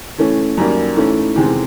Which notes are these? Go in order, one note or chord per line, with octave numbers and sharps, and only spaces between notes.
E3 A3 C#4
F#2 D#3 G3 A#3
G#2 E3 A3 C#4 E4
E2 C3 D#3 G#3 C4